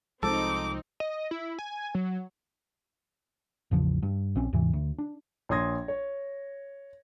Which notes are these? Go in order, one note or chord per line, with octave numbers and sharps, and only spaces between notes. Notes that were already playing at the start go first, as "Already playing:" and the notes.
C2 F3 G#3 C4 D#4 A4 D6
D#5
E4
G#5
F#3
A1 E2 C#3 F3
G2
A#1 C4 C#4
D#2 G#2 C3 E3
D2
D4
A#1 C#5 C6 D#6 G#6 A#6
C#5